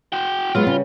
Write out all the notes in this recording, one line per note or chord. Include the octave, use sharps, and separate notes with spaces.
F#4 G5
F#3 G#3 B3 F4
C#3 G3 C#4